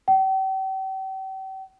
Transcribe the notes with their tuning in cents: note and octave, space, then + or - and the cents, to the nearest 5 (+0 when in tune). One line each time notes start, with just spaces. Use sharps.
G5 -40